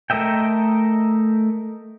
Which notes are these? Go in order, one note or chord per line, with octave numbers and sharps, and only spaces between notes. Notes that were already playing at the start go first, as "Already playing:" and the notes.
A3 A#4 D#5 E5 G5